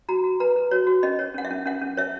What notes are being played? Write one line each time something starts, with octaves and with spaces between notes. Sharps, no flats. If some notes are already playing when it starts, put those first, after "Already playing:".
F#4 A#5
F#4
B4 A#5
B4
F#4 C#5
F#4
C#4 D#5
C#5
C#4 F#5
E5
C#4
C#4 F#5
C#4
C#5 E5